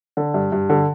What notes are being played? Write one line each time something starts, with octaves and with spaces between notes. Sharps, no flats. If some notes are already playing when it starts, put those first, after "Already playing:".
D3
G2
G2
D3